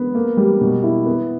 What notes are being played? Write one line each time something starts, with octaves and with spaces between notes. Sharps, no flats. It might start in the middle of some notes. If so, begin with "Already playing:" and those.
Already playing: B3
A#3
G3
B2
E4
B3